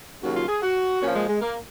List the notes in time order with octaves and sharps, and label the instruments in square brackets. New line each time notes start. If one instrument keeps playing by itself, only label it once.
[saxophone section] D#2 C#3 F#3 F#4
F4
G#4
F#4
A#2 F3 C#4
G#3
G#3
A#3